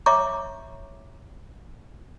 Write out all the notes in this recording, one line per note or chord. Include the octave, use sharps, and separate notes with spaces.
C#5 E5 A#5 C#6 D6